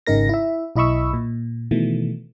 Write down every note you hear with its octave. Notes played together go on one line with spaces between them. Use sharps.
G#1 C#3 D#4 A#4 A#6
E4 E5
B1 E4 D#5 B5 C#6 E6
A#2
B2 D#3 E3 A3